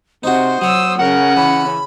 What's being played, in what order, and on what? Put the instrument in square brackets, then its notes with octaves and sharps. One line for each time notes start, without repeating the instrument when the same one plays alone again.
[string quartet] C3 [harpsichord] D#4 F#4 [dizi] C5
[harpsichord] F#3 C#5 [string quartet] D#6 E6
[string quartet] C#3 C#4 [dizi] A#4 [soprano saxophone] F#5
[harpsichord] E3 [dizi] B5